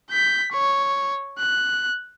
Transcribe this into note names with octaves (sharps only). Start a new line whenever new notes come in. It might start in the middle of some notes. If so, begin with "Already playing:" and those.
G6 B6
C#5
F#6